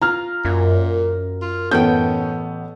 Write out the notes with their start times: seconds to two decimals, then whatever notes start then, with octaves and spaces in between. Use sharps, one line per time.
0.02 F4 A#5 F6
0.45 F#2 A#2
1.42 F4
1.71 A1 B3 C#4 A4 G5 G6